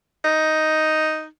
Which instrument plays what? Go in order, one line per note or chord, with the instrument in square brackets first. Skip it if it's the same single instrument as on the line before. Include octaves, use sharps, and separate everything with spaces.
[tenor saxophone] D#4